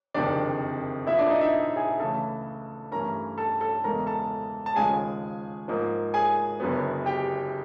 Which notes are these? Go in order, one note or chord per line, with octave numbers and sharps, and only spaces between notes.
F#1 F2 C3 D#3 D4 D5
A#1 A#2 F3 E4 E5
D4 D5
D#4 D#5
E4 E5
G#4 G#5
C#2 C#3 E3 A3 A4 A5
G2 E3 A3 C#4 A#4 A#5
A4 A5
A4 A5
E2 C#3 E3 G#3 C#4 A#4 A#5
A4 A5
A5
D#2 C#3 F3 G#3 G#4 G#5
G#2 F3 A#3
G#4 G#5
F#1 F#2 D3 F#3 B3
G4 G5